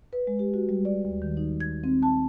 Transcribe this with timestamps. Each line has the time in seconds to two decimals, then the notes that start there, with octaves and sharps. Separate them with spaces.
0.13 B4
0.27 G#3
0.39 G4
0.54 F#4
0.69 G3
0.85 D5
1.05 D#2
1.22 D#3
1.37 D#4
1.60 G#6
1.84 C4
2.03 A5